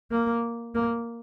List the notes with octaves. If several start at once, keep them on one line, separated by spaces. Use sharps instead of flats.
A#3
A#3